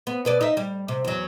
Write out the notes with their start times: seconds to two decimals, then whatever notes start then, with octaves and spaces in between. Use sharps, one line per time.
0.07 B3
0.25 B2 B4 D5
0.41 D#4 E5
0.57 G3
0.88 C3
1.04 E2 F#3